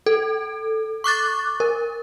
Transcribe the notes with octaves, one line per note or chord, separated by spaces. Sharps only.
A4
C#6 D6 F#6 A6
A#4